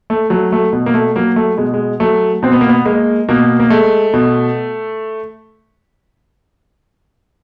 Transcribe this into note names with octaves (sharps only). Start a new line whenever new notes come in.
A3
F#3 A3
A3
B2
A#3
A3
F#3 A#3
A3
B2 G#3
G#3
F#3 A3
B2 C4
B3
A#3
B3
G#3 A#3
B2 A#3
A#3
G#3 A3
B2